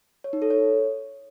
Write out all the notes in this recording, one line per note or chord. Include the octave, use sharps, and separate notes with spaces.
C#5
D#4
A4
C#5